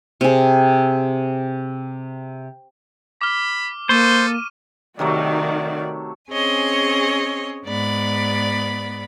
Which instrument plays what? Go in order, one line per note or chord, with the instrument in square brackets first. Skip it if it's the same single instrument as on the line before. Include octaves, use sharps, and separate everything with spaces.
[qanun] C3 G#4
[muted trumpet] B5 [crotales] D6 F6
[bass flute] A#3 [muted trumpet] A4 [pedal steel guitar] C5 [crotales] C#6 D#7
[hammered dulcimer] C3 F#3 A3 [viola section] D#3 [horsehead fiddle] F#4 D5
[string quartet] C4 C#4 G#4 C#5 D#5 G#5
G#2 B3 D5 B5